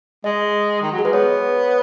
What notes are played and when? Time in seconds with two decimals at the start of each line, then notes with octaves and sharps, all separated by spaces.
0.24 G#3 D#5
0.82 D#3
0.92 F#3
0.99 G#4
1.03 G#3 B4
1.13 B3 C#5